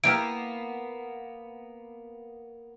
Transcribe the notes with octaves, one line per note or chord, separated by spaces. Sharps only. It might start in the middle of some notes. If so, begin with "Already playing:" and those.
A#3 B3 E4 G4 A#4 D7